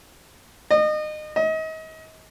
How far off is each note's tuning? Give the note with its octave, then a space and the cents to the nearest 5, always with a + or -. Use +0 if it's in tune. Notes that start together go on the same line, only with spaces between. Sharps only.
D#5 -30
D#5 +35